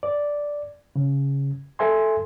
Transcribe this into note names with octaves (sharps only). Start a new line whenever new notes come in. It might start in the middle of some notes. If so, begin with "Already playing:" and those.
D5
C#3
A4 E5 G#5 C6